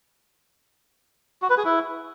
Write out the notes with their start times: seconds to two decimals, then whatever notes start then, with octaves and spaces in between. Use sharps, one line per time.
1.42 F#4
1.50 B4
1.58 G#4
1.65 E4